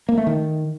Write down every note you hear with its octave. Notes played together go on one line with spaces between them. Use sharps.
A#3
A3
D#3